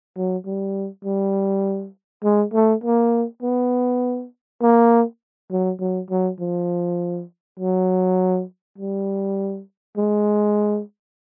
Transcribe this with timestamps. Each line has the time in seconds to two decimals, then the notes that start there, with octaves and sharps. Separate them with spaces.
0.16 F#3
0.46 G3
1.05 G3
2.24 G#3
2.54 A3
2.84 A#3
3.43 B3
4.62 A#3
5.51 F#3
5.80 F#3
6.10 F#3
6.40 F3
7.60 F#3
8.78 G3
9.97 G#3